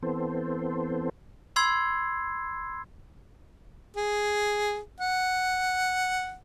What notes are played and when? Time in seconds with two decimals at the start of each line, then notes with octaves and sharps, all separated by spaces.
0.03 E3 B3 C4 A4 C5
1.56 B5 C6 E6 G#6 C7
3.96 G#4
5.01 F#5